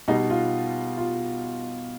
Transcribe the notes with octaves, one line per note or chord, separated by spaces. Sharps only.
B2 G3 D#4
F4
F4